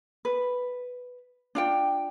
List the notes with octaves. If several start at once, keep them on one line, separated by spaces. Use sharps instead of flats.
B4
D4 F4 G5